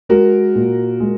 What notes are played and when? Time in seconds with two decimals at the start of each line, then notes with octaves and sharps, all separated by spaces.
0.09 G#3 F#4 A#4
0.55 A#2
1.00 G#3